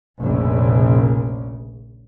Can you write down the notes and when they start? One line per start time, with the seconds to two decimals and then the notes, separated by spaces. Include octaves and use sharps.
0.20 F1 A#1 C#3